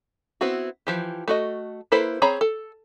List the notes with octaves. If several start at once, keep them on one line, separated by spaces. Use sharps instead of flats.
B3 C4 E4 F#4
E3 F3 G4
A3 F#4 D#5
A#3 E4 A4 B4 C5
C4 G#4 C#5 A#5 B5
A4